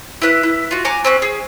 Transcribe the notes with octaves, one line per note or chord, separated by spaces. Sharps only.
E4 B4 F#6
E4
F4 F#4
F#5 G#5 A#5 D6
C4 C#4 F#6
G#4